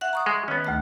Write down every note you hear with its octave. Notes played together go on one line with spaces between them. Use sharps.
E5 F#5 F#6
A#5 C#6 D#6
G#3
D#3 B3 C#4
D2 A3 F#6